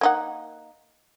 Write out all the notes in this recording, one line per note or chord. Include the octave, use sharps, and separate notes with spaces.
A#3 D#4 F#5